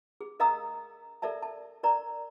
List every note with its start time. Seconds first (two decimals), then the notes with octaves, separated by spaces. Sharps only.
0.21 G#4
0.40 A#4 D#5 F5 A#5 D#6 E6
1.22 A4 A#4 D5 E5 A5
1.42 A5
1.83 A#4 D5 A#5